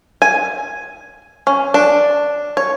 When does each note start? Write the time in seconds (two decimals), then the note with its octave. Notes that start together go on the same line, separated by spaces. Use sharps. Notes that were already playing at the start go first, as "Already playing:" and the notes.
0.22 G#5
1.47 C#4
1.74 D4
2.57 C#5